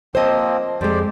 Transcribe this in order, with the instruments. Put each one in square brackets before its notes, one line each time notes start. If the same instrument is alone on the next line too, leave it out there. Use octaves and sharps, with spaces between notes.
[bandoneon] F3 A#3 C4 [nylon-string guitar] C5 D#5
[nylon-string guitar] F2 G#3 [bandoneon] G4 C5 D5